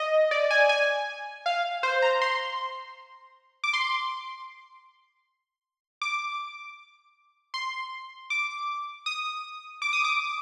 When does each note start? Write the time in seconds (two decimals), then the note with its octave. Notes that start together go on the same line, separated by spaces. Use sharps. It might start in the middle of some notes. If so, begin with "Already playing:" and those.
Already playing: D#5
0.31 D5
0.51 G#5
0.69 G#5
1.46 F5
1.83 C5
2.02 A#5
2.22 C6
3.64 D6
3.73 C6
6.02 D6
7.54 C6
8.30 D6
9.06 D#6
9.82 D6
9.93 D#6
10.04 D6